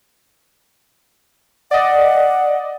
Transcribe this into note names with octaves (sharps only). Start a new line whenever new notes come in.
D5 D#5 F#5